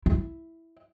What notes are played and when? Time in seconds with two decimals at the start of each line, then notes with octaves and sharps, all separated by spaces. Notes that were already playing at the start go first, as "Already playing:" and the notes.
0.06 E4